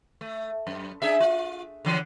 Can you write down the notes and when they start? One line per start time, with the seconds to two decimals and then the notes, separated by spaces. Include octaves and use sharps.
0.21 A3
0.67 F#2
1.02 D4 G#4 E5
1.20 F4
1.85 D3 E3 F#3